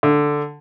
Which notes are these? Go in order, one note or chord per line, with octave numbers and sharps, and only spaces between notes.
D3